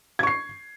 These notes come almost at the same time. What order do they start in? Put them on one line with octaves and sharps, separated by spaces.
G#6 C#6 C7